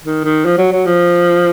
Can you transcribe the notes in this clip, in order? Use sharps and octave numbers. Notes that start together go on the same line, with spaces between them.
D#3
D#3
F3
F#3
F#3
F3